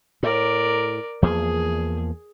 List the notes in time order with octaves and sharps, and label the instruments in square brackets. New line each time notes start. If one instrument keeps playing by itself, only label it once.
[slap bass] A2 [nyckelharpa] A#4 D5
[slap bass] E2 F3 A#3 [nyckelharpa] G#4